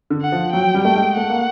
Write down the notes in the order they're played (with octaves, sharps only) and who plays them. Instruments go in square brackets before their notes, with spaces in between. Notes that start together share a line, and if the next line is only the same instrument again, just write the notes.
[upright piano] D3
[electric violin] F#5
[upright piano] F3
[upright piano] F#3 [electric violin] G5
[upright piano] G3
[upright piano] A3 [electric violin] G5
[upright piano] G#3
[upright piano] A3 [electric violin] F#5
[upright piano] A#3